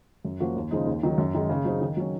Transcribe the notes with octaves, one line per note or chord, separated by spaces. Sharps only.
F#2
F3 A#3 C#4 F#4
D#2
C#3 F3 G#3 D#4
D#2
D#3 F#3
F#2
D#3 G#3
C#3
F#3 C4 D#4
D#3
F#3 C#4